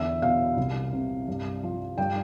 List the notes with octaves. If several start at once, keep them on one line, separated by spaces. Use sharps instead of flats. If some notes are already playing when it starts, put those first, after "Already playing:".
Already playing: E2 D3 E5
B2 F5
C2
C3
G2
F3
G2 G5